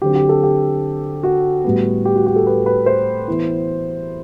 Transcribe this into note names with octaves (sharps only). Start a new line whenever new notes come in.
D3 F#3 C4 G4
G4
A4
G4
F#4
A2 G3 B3
G4
F#4
G4
A4
B4
B4
C5
E3 B3 E4